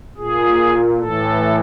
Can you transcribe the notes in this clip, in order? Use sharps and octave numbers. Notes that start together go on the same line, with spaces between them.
A#2 G#4
A2 E3 A4